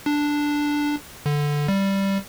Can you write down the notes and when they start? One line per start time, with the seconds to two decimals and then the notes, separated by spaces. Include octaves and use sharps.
0.06 D4
1.26 D3
1.68 G3